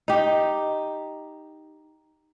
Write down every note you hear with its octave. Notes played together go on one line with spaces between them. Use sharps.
D#4 G4